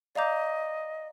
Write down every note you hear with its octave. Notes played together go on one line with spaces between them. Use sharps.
D5 D#5 F5 A#5 D6 G6